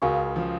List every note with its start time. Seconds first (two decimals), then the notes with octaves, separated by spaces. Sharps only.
0.02 C#2 C#3 F#4 A#4 F5 G#5 C#6
0.36 F3